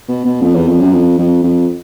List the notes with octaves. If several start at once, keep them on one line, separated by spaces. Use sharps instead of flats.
B2
B2
F2
E2
F2
F#2
F2
F2
F2